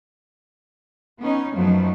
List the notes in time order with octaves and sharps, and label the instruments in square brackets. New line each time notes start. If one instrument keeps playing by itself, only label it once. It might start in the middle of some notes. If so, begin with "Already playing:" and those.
[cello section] B3 C#4 D#4
F#2 F3 F#3 A3 B3 D#4